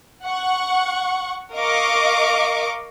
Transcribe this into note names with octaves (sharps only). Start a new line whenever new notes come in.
F#5 C#6
A#4 D#5 F5 C#6 D6